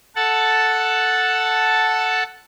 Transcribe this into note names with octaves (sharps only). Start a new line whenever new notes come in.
A4 F#5 A5